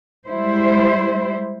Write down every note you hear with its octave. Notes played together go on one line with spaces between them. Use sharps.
G3 G#3 E4 C5